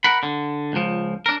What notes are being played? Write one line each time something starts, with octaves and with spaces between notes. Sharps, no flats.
A#4 F#5 B5
D3
C#2 F3
D4 A#4